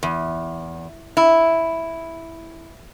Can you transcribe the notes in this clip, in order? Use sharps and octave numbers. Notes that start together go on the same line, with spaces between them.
E2
E4